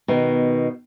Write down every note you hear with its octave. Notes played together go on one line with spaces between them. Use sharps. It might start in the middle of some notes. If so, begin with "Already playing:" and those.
B2 D#3